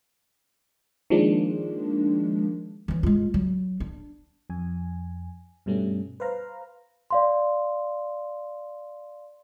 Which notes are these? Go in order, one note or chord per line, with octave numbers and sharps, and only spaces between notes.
D#3 F3 G#3 A#3 D4
E3 C#4
G#3 F4
F#3
D4
F2 G#5
G2 B2 G3 A3 C#4
B4 C5 F5 A#5
D5 F5 C6